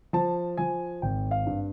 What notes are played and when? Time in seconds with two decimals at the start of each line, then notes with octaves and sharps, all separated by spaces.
0.13 F3 A5
0.57 F3 G#5
1.02 G#1 G5
1.31 F5
1.46 G2